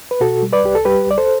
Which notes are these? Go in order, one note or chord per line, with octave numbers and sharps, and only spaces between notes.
B4
B2 F#4 A4
G3
B4 D5
C2 G4
A4
G3 G4 B4
C2 D5
A4 C5